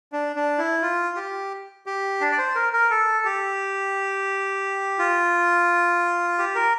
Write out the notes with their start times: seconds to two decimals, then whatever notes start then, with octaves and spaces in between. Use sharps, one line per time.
0.12 D4
0.36 D4
0.58 E4
0.82 F4
1.16 G4
1.86 G4
2.21 D4
2.32 D5
2.38 C5
2.55 A#4
2.73 A#4
2.91 A4
3.25 G4
4.99 F4
6.38 G4
6.55 A#4